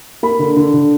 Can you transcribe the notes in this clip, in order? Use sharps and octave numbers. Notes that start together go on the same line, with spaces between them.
A#3 B5
D3
D3
D3